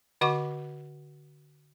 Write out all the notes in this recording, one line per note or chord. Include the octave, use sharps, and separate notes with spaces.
D3 F#4 D#5 F#5 C#6 D6